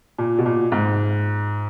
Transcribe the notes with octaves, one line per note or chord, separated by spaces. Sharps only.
A#2
B2
A#2
G#2